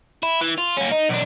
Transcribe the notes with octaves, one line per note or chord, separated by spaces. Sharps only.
E4
E3
F4
A#3 C#4
D#4
B1 D4